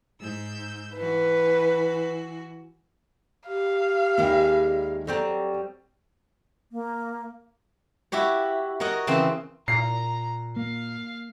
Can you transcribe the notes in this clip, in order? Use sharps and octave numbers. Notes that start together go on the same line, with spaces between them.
G#2 E6 G6
E3 F#4 B4
G4 F5
D#2 D#3 G3 G#3 E5 G5
F#3 G3 C4 A4 A#5
A#3
E4 F#4 G4 C#5
F#4 A#4 C#5 D#5 F#5
C#3 E3 C4 C5
A#2 A#5 C7
A#3 F5